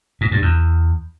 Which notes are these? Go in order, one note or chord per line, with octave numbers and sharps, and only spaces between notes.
G#2
G2
E2